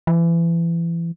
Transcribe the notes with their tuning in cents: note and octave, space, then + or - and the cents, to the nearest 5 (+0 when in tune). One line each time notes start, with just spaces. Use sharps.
E3 +30